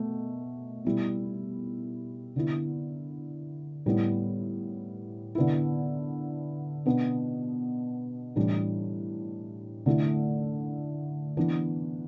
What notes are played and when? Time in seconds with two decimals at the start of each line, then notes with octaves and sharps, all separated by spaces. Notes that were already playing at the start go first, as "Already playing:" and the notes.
Already playing: B2 A3
0.85 B2 G3 E4
2.36 D3 B3 E4
3.86 A2 G3 B3 E4
5.35 D3 B3 E4
6.86 B2 B3 D4
8.36 A2 E3 G3 D4
9.86 D3 A3 E4
11.37 E3 B3 D4